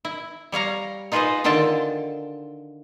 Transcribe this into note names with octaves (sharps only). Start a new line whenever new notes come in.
E4
G3 C#5 F5 A#5
D#4 F4 G#4 B4 C5 D#5
D3 D#3 F4 A4 G5 A5